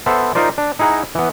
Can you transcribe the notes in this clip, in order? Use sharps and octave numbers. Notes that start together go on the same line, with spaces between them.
B3 A4 C5 E5
D#4 F4 A#4 C5 D5
D4
D#4 E4 G#4 F#5 A#5
E3 B3